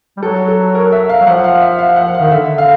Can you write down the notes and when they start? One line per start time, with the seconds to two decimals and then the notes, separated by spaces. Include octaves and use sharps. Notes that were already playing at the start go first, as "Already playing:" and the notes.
0.17 G3
0.22 F#3 A4
0.48 A4
0.75 A#4
0.92 E5
1.09 F5
1.21 F#3
1.27 F3 F#5
1.44 F5
1.61 E5
1.79 F5
1.96 F#5
2.15 F5
2.21 D#3
2.31 D3 E5
2.58 F5